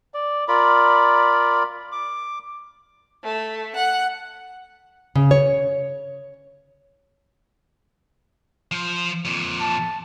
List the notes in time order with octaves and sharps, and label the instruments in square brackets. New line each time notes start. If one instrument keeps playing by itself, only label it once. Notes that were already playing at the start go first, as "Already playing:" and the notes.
[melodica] D5
F4 A#4 D5 B5
D6
[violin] A3
F#5
[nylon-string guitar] C#3
C#5
[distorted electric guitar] F3 C5
F2 A#2
[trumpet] A5